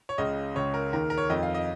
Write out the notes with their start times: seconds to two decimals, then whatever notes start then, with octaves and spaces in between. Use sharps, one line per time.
0.09 C#5
0.18 C#2 C#3 D#5
0.55 C#2 C#3 C#5
0.74 A#4
0.93 D#2 D#3 A#4
1.10 A#4
1.18 C#5
1.30 F2 D#3 D#5
1.43 F5
1.54 D#5